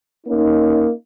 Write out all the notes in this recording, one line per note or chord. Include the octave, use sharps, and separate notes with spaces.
A#3 C#4 D#4